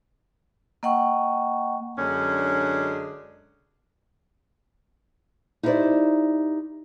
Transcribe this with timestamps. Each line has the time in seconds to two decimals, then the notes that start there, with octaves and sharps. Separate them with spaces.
0.83 A#3 D#5 F#5 G5 C#6
1.98 F#2 D3 F#3 G#3 C#4 D4
5.63 D#4 E4 G4 G#4 C5 D5